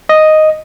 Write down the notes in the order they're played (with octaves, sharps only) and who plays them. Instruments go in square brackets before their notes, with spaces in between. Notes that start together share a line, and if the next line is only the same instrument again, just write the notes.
[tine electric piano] D#5